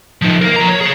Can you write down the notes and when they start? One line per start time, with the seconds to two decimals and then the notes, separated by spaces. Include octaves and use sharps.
0.22 F3 D#4
0.42 A#4 F5
0.56 F3 A#5
0.68 C#5
0.81 G#4 C#5